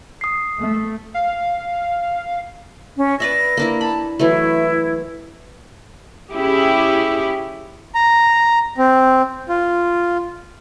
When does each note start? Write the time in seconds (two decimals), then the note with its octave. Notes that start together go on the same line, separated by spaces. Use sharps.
0.21 D#6 C7
0.60 A3
1.14 F5
2.97 C#4
3.20 B4 D5 E5 A#6
3.57 A#3 D4 E4
3.81 A5 B5
4.19 E3 F#3 A3 E4
6.31 C#4 E4 G4 G#4
7.95 A#5
8.78 C4
9.49 F4